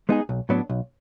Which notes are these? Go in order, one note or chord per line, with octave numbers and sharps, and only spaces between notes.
G#3 B3 D#4 G#4
B1
A2 F#3 B3 D4
B1